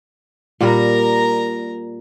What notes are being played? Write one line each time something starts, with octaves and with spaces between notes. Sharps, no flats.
A#2 G3 A#4 A#5